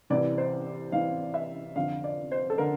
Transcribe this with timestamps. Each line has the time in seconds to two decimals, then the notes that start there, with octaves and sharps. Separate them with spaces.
0.10 C2 C3 E3 D5
0.38 C5
0.92 C2 C3 E3 F5
1.34 E5
1.76 F2 D3 F5
2.04 D5
2.32 C5
2.50 A4
2.58 D3 A#4